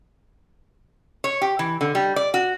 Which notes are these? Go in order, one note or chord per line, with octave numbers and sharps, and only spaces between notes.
C#5
G4
E3
D3
G3
D5
F#4